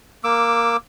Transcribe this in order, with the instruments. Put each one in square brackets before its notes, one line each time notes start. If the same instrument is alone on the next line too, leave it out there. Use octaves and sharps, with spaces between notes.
[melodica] A#3 D6 E6